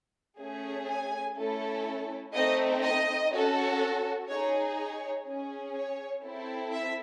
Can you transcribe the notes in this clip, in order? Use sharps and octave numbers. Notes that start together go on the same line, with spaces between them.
A3 C#4 G#4
G#5
A3 C#4 E4 A4
A3 C4 D#4 D#5
D#5
C#4 F#4 A4
D#4 G#4 C#5
C#5
C#4 G#4
C#5
C4 E4 A4
E5